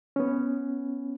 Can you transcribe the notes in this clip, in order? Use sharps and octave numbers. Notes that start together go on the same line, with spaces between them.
B3 C#4